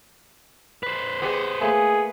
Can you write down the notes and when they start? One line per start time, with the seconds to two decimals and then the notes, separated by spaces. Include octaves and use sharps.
0.83 B4 C5
1.22 B3 G4 G#4 D#5
1.61 A3 A#3 G#4